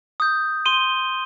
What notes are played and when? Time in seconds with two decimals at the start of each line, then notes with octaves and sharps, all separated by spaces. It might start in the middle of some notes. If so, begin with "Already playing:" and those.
0.20 D#6 G6
0.66 C6 D#7 G7